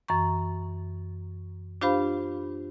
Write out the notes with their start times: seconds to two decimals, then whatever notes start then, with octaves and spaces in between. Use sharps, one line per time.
0.08 F#2 E3 A#5 C#6
1.81 D4 F4 G4 C5 F5 B5